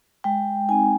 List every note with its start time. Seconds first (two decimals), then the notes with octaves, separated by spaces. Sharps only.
0.24 G#3 G5
0.69 C4 D#4 G#5